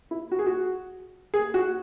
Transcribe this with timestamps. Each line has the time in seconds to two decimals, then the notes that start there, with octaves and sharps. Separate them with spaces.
0.11 E4
0.32 F#4
0.39 G#4
0.46 F#4
1.34 G#4
1.54 F#4